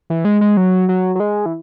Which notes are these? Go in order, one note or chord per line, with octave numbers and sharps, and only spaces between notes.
E3
G#3
G#3
F#3
F#3
F#3
G#3
E3